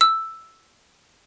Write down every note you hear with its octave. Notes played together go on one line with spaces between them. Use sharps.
E6